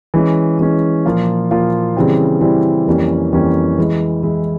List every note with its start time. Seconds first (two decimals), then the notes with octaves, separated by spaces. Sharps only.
0.14 E3 G#3 C#4
0.59 E3 G#3 C#4
1.06 A#2 F3 A#3 F4
1.51 A#2 F3 A#3 F4
1.95 C#3 E3 G3 C4 E4
2.41 C#3 E3 G3 C4 E4
2.87 F2 E3 G3 A#3 C#4
3.33 F2 E3 G3 A#3 C#4
3.78 E3 G#3 E4
4.23 E3 G#3 E4